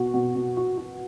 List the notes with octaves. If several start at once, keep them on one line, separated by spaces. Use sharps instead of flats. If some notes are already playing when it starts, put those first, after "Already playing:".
Already playing: B2 B3 F#4
B2
B2
F#4
F#4